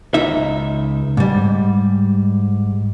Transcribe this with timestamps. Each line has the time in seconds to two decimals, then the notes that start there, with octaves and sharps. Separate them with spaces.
0.14 C#2 D#4 E5
1.17 G#2 G3